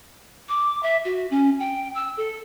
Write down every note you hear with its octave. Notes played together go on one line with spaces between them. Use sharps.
D6
E5
F#4
C#4
G5
E6
A4